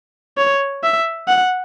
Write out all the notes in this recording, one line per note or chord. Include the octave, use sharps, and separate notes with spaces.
C#5
E5
F#5